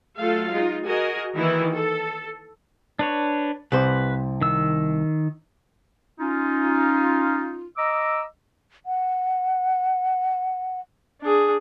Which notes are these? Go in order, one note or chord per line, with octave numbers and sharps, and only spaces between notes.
F#3 A3 F4 A4 F5
G#3 D#4 F4
F#4 G#4 A#4 D#5 G#5
D#3 E3 A#3 E4
A4
D4 B4 C#5
C2 C3 B4 C5
D#3 E6
C#4 D#4 F4
D#5 A#5 D6 E6
F#5
D4 G#4